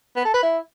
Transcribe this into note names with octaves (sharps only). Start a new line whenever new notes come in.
B3
A4
B4
E4